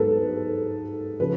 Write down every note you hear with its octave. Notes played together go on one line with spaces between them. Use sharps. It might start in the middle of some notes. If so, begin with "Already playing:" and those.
Already playing: G#2 F#3 B3 A4 B4
C#3 F3 B4